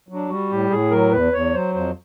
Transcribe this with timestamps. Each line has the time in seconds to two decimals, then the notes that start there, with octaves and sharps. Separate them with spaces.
0.09 F#3
0.14 D4
0.29 G3 F#4
0.51 A2 G4
0.70 A2 G#4
0.91 F#3 A#4
1.12 E2 B4
1.33 E2 C#5
1.54 F#3 C5
1.74 F2 C5